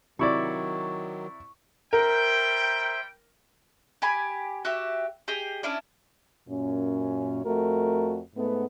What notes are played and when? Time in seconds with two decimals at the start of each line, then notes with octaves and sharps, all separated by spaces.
0.19 C3 D#3 F#3 E4 D5 C#6
1.93 G3 A#4 C5 E5 G5
4.02 G4 G#5 B5
4.65 F#4 G4 E5
5.28 G4 G#4 D#5
5.63 C#4 D4 E4 D5
6.49 F#2 A#2 C#4
7.44 F2 A3 F#4 A#4
8.36 G#2 A3 B3